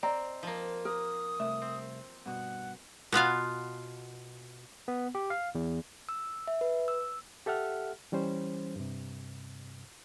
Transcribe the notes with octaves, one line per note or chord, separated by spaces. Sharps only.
C4 D5 D#5 A#5
F3 A#3
A#4 D#6
C2 A3 E5
C4
G2 B2 F#5
B2 B3 F4 F5
B3
G4
F5
E2
E6
E5
B4
E6
G4 A4 E5 F#5 F6
E3 G3 C#4 C5
G2 C3